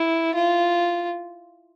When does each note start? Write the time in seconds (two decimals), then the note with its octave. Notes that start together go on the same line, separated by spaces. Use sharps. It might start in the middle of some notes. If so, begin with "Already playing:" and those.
Already playing: E4
0.35 F4